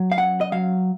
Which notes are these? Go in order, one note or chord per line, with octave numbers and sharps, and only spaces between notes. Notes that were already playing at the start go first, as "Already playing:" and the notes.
Already playing: F#3
F5
F#2 F#5
D#5
F#3 F5